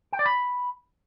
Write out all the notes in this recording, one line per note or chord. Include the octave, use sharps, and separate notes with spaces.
G5
D5
B5